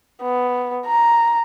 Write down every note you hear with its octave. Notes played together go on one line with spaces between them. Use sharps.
B3
A#5